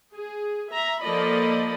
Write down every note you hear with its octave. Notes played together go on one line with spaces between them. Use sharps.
G#4
E5 A#5
F3 A#3 A4 D5 D#5 B5